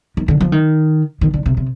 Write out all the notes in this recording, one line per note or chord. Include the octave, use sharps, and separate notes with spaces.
D#3
D3
F3
D#3
D#3
D3
C3
C3